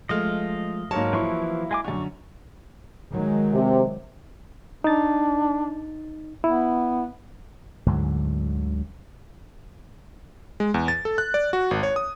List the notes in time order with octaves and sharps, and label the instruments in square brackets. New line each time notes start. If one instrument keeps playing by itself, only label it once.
[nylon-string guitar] F3 G#3 A3 [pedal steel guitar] D#5 F5
[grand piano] G#2 A#4 C#5 [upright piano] F#3 A#3 [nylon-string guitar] A5
[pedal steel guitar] E3 F3 C#6 [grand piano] E4
[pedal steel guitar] G#3 G#5 D6
[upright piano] F#2 D3 [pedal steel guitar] C#6
[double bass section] D#3 F#3 G#3
[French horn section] C3
[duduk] D4 [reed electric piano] D#4 A6
[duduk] B3 [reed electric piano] E4
[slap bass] D2 G#2 D3 F#3
[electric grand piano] G#3
E2
A6
A4
F#6
D5
F#4
G#1
C#5
D#6